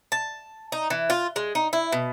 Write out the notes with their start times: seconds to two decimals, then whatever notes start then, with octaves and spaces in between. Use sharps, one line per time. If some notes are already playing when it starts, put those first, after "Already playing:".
0.12 A5
0.72 D#4
0.90 E3
1.10 F4
1.36 G#3
1.55 D#4
1.73 E4
1.92 B2